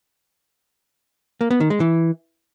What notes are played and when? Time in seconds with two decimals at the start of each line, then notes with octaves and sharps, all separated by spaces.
1.41 A#3
1.51 B3
1.60 D#3
1.70 G#3
1.80 E3